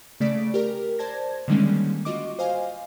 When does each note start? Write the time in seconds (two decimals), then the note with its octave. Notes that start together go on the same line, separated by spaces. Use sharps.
0.20 C#3 A3 D5 B6 D7
0.54 G4 A#4
0.99 C5 D5 A5 G#6 A#6
1.48 D3 D#3 G3 G#3 A#3 C#4
2.05 F4 F#4 D#5 C#6 D6
2.39 C5 D#5 F5 G#5